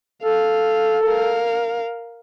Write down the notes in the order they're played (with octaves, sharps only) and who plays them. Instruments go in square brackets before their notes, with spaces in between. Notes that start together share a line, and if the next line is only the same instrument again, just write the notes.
[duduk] A4 [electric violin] F5
[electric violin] A#4 F5